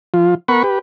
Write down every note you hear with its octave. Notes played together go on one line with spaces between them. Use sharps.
F3 F4
B3 A#4 F#5 B5 C#6
G4 B4